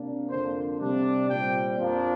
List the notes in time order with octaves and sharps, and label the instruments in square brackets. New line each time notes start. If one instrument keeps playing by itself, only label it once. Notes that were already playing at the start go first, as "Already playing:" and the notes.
Already playing: [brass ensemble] C3 A#3 D4
F2 D3 A#3 D4 C5
C3 G3 D4
A#2 G3 C4 G5
F2 F3 A#3 D4